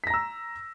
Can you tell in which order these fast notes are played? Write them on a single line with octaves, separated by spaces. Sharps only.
B6 A#6 A#5 E6